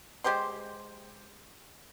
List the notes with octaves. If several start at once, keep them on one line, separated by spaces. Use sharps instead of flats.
G#3 G4 C5 C6